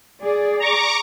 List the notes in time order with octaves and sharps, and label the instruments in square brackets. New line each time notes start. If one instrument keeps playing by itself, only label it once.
[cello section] G#4 D5
[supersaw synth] A#5 C#6 D6